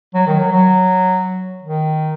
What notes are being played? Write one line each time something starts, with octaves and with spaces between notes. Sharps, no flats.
F#3
D#3
F#3
F#3
D#3